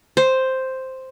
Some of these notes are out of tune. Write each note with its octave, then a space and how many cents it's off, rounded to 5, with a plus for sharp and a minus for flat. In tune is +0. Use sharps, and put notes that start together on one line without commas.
C5 +0